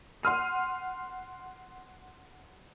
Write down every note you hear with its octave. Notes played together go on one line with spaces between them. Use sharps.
F#5 C6 F6 D#7